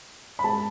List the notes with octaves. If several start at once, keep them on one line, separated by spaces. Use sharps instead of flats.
B5
G#3 A5